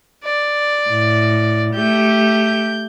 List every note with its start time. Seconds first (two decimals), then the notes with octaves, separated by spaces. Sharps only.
0.24 D5
0.90 A2
1.75 A3 G4 G6